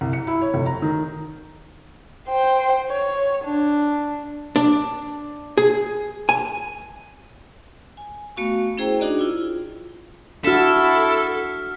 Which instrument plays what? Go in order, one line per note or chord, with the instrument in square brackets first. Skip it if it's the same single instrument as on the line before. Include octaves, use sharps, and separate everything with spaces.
[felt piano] C2
C#7
E4
C#5
F1
A#5
D#3
[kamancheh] C5 G5
C#5
D4
[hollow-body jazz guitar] D4
G#4
G#5
[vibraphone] G#5
A3 B3 F#4 F5 C#6
C#4 E4 G#4 C5 G5 A#5
D4 D#4 F#4 G#4 D5 D#5
E4 F4
[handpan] D4 F#4 [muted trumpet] E4 [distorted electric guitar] A4 [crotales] F6 B6